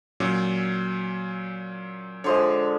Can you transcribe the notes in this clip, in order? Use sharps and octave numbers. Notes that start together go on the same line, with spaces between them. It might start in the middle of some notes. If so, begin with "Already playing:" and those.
A#2 F#3 C#4
D3 F3 G#3 C#5 C6